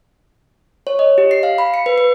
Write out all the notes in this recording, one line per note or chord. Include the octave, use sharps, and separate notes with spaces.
C#5
D#5
G4
C7
F5
B5
C#7
B4
B4